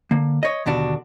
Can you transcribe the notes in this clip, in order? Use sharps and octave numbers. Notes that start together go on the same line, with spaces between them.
D3 A#3
C#5 D#5
D#2 B2 D3 D4 F#4